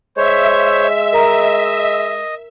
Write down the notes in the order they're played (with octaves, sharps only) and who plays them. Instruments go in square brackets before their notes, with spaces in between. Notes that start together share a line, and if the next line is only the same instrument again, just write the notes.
[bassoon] G#3 [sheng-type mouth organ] C5 C#5 [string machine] E5
[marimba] A#4 A#5 [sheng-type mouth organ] D#5